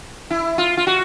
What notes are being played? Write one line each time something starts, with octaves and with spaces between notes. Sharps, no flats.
E4
F4
F4
F#4